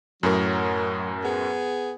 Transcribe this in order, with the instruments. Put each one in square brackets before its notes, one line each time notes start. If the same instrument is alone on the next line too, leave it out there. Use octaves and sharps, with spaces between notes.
[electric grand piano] F#2 A2 A#4 [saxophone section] F#3
[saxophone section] B3 G#4